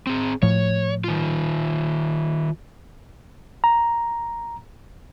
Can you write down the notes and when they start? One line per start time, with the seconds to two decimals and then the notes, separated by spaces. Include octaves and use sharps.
0.07 C4 G#4
0.42 A2 F3 C#5
1.04 D#3 F4
3.64 A#5